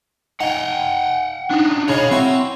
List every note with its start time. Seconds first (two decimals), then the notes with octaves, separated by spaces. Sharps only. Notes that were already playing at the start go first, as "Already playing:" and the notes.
0.41 D#4 F#5 G5
1.51 D4 D#4
1.88 C#3 C#4 D#4 C#5 B5
2.11 C4 C#4 E4 F#4